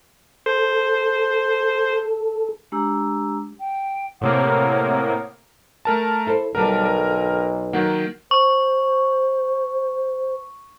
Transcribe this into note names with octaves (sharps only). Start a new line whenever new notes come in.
A4 C5
G#3 D4 G4 A#5 E6
G5
A2 C3 A#3 C#5 F#5 D#6
A3 A#4 A5
E4 A4 C5
B1 D3 G3 D4 A#4 A5
A#4
D#3 F#3 A#3 F#5
C5 C#6